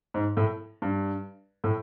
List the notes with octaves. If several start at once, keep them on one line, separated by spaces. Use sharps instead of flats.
G#2
A2
G2
A2